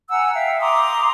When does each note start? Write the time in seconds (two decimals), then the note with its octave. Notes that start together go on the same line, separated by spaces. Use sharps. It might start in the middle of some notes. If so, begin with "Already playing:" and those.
0.10 F#5 G#5 A#5 E6
0.33 E5 F5 G5
0.60 A#5 C6 D6 D#6